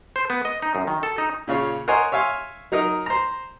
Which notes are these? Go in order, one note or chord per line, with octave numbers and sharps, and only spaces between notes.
C5
B3
D#5
D#4
F#2
D#3
A4
D#4
A#2 C#3 F4 C#5
A#4 C5 C#5 D#5 F#5 G#5
C#5 E5 F5 G#5 C6
F#3 D#4 A#4 D#5
C5 A#5